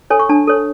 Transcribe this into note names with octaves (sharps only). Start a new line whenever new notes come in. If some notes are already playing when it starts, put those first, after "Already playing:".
A4 C#5 G#5
C#6
D4 A5
A4 C#5